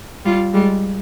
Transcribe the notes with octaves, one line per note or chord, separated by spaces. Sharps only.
G3 F4
G3 G#3